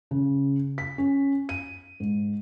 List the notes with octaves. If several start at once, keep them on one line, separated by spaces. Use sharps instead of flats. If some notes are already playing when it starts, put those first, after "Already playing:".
C#3
B6
C#4
D#7
G#2